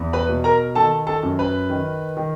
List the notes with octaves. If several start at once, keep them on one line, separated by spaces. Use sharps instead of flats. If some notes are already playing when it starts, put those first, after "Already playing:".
Already playing: E2
B4 B5
B2
A#4 A#5
D#3 A4 A5
A4 A5
F#2
B4 B5
D#3
D#3